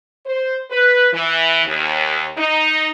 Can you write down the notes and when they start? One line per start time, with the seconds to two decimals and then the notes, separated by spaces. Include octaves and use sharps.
0.25 C5
0.71 B4
1.12 E3
1.65 D#2
2.37 D#4